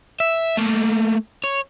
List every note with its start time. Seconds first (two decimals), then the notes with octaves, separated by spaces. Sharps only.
0.20 E5
0.57 A3 A#3
1.44 C#5